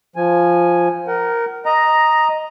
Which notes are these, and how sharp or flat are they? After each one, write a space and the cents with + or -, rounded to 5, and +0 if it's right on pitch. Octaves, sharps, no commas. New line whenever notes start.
F3 +0 G#5 +0
A#4 +0 F#5 +40
D#5 +0 A#5 +5